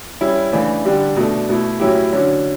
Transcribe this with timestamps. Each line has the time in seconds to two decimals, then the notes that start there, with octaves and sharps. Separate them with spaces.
0.21 G3 C#4 E4
0.52 C#3 E3 A3 D4
0.85 D3 G3 D4 G4
1.16 B2 A3 D4 A4
1.49 B2 A3 E4
1.80 A2 F#3 C#4 E4 G4
2.12 D3 F#3 C#4